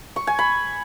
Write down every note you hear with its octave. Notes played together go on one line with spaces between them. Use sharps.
C#6
G#5
B5